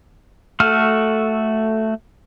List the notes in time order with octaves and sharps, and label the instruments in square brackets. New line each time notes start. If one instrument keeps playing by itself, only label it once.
[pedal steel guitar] A3 F#4 A4 F6